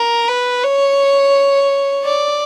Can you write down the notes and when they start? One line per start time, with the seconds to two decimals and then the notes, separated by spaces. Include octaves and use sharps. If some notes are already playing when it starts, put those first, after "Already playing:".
Already playing: A#4
0.28 B4
0.63 C#5
2.04 D5